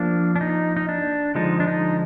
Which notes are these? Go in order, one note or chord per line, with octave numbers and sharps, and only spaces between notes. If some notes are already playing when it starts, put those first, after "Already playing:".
Already playing: F3 A#3 D4
D4
D#4
D#4
D4
D3 F3 G#3 D#4
D4
D#4